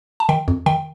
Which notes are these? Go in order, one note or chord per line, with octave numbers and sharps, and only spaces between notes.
A5
D#3 G5
F2
D#3 G5